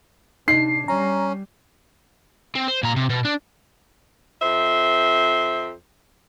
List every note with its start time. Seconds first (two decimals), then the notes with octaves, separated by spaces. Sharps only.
0.48 C3 D4 D#4 C7
0.88 G3 C#4 A#5
2.55 C4
2.68 C5
2.83 A#2 A#5
2.96 C3
3.10 B2
3.25 D4
4.42 F2 C5 E5